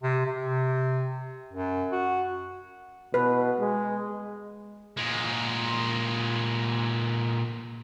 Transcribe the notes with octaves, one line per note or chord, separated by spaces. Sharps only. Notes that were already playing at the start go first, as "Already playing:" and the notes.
C3
C3
F#2
F#4
B2 B4
G#3
A#2 G#3